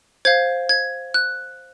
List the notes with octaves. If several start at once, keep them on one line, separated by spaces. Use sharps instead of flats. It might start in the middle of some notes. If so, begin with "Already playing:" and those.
C5 F5 G#6
G#6
F#6